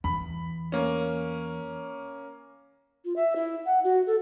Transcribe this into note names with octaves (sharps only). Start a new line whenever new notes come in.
E2 B5
A#3 C#4
F4
E5
E4
F#5
F#4
A4